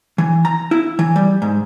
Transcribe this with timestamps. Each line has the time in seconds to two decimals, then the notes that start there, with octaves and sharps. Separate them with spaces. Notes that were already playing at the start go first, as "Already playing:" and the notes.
0.18 E3
0.45 A#5
0.71 E4
0.99 E3
1.16 G3
1.42 G#2